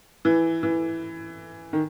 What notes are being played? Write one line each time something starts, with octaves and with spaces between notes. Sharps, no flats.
E3
E3
D#3